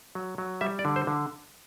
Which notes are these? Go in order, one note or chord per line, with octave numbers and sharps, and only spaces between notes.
F#3
F#3
G3 E5
D5
D3
C5
D3